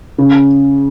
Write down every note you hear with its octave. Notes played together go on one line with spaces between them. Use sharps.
C#3